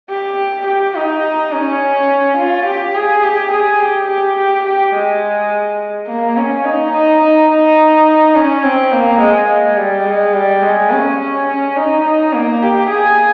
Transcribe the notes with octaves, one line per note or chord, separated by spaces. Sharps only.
G4
G4
D#4
C#4
F4
G4
G#4
G4
G#4
G4
G4
G4
G4
G#3
A#3
C#4
D#4
D#4
D#4
D#4
C#4
C4
A#3
G#3
G#3
G3
G#3
G3
G#3
C#4
C#4
D#4
D#4
A#3
G4
G#4